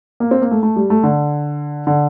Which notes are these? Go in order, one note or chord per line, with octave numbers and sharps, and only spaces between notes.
A#3
C4
A#3
A3
A3
G3
A3
D3
D3